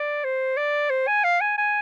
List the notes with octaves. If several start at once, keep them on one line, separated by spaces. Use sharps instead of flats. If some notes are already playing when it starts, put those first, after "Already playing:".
Already playing: D5
C5
D5
C5
G#5
F5
G#5
G#5